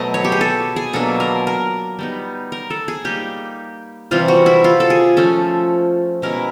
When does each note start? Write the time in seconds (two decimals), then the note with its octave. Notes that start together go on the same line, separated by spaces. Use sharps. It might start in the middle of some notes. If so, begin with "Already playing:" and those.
Already playing: B2 F#3 A3 D#5
0.14 C#5
0.24 G4
0.32 G#4
0.41 A4
0.76 G#4
0.93 B2 F#3 A#3 D4 A4
1.20 A#4
1.47 A#4
1.99 G3 B3 D#4
2.52 A#4
2.70 A4
2.88 G#4
3.04 G3 A#3 D#4 G4
4.11 C3 E3 G3 C4 F4
4.28 F#4
4.46 E4
4.64 F4
4.80 A4
4.90 G#4
5.17 F3 A3 C#4 A4
6.22 B2 G#3 C#4 E4 A#4